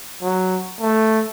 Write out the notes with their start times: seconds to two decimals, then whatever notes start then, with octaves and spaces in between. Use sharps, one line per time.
0.23 F#3
0.80 A3